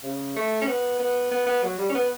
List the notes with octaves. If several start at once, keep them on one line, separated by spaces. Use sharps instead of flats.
C#3
A3
C#4
B3
B3
B3
B3
F#3
G3
C#4
B3